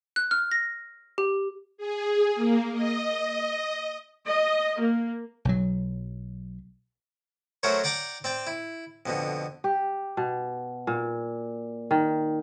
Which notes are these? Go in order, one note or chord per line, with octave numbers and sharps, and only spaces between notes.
F#6
F6
A#6
G4
G#4
A#3
D#5
D#5
A#3
B1 F#3
F#3 A3 F#4 A#4 C5 C#5
D5 F#5 G5 A#5 D6
C4 D5 G5
E4
F2 B2 D3
G4
B2
A#2
D#3